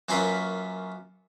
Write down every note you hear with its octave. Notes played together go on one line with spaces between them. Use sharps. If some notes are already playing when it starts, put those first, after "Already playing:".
F#2 A#3 C#4 F4 B4 E5